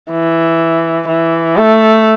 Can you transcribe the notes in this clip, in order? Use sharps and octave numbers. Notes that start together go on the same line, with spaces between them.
E3
E3
A3